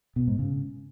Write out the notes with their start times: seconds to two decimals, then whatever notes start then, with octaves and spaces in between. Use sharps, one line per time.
0.16 B2
0.27 G#2
0.39 C#3